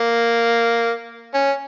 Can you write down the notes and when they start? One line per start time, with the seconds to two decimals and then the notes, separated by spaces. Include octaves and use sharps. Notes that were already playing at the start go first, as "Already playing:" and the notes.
Already playing: A#3
1.34 C#4